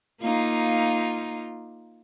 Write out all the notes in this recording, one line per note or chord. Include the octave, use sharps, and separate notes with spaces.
A#3 D#4 F4